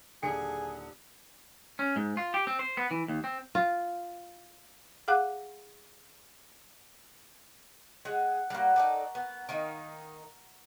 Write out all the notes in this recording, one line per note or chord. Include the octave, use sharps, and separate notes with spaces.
D#1 D3 G#4 C#7
C#4
G#2
F4
G4
C4
C5
B3
E3
D#2
C4
F4
G#4 F5 F#5 D6 F#6
G#3 F#5
G3 A#3 F#4 A#4 F#5
D#4 A4 D5
B3
D#3 A#3 D#4